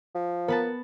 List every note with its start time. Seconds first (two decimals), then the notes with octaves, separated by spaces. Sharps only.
0.15 F3
0.48 B3 A#4 B4 A5